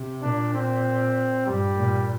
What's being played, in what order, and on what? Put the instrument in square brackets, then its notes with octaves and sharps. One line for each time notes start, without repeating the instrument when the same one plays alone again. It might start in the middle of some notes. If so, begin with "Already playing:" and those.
Already playing: [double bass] C3
[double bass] A#2 [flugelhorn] D4
[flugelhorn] C4
[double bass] G2 [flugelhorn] G3
[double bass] A#2